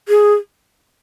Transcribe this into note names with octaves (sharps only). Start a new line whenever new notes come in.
G#4